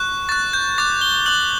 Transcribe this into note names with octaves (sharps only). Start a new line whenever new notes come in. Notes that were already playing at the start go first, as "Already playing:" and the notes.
Already playing: C#6 F#6
C#6 F#6 A6
G6
D6 F#6 A6
G7
D6 F#6 F#7